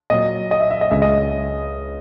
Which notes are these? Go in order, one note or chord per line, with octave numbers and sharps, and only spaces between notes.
A#2 F#3 D#5
D#5
E5
E5
D#5
C#2 C#3 G#3 E5
D#5